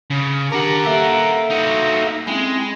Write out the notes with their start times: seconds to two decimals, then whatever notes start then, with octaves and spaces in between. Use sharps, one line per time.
0.10 C#3
0.52 D#3 D4 G4 A#4 F#5
0.85 A#3 A4 E5
1.50 D#4 F#4
2.28 G#3 C4 C#4 E4